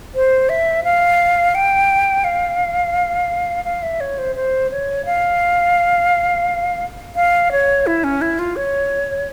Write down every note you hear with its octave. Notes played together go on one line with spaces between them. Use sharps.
C5
E5
F5
G5
F5
F5
E5
C#5
C5
C5
C#5
F5
F5
C#5
E4
C#4
E4
F4
C#5